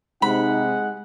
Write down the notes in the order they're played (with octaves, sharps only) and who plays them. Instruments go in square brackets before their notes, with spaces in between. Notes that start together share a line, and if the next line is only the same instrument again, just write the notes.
[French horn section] C3 D#4 [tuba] G#3 [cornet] F#5 [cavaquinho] B5